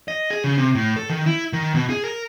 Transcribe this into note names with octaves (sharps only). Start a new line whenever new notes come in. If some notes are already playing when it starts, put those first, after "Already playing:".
D#5
G#4
C#3
C3
A2
A4
D#3
E4
D#3
B2
G#4
A#4